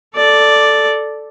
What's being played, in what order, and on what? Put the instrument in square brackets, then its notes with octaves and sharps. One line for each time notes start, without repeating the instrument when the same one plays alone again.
[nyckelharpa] A4 D5